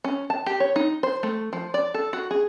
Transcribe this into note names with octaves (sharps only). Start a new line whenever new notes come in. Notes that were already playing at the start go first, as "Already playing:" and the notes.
C#4
A5
G4
C#5
D#4
C5
A3
F3
D5
A4
F#4
G#4